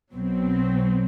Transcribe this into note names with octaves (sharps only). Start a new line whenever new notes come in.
B1 B2 F#3 C4